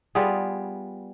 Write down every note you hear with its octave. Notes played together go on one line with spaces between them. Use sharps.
G3 B3 F4 G#4